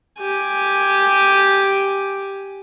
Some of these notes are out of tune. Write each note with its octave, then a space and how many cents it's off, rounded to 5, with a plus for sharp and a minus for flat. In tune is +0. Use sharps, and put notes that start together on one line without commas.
G4 +0 G#5 +0